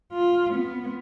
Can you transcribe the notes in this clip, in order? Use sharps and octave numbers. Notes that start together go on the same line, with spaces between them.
F4
B3